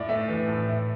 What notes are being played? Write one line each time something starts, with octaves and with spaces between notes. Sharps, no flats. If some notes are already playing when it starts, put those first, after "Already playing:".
Already playing: A2 E4 D5
A3 E5
E3
A2
E4